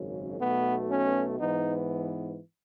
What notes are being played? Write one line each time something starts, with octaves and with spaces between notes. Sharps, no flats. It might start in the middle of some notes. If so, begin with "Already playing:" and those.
Already playing: G#1 F#2 C#3
B1 B2 A3 B3
C#4
G#2 E3 B3 D#4